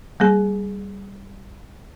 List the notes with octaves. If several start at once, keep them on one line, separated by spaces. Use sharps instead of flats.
G3 A#3 G#4